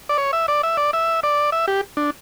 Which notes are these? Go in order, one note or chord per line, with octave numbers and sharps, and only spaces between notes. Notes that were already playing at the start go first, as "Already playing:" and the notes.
D5
C#5
E5
D5
E5
D5
E5
D5
E5
G4
D4